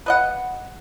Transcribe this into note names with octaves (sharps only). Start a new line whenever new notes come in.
B4 D#5 F#5